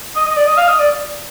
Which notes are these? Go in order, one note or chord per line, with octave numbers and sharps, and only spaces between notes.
D#5
D#5
D5
D#5
F5
D#5
D5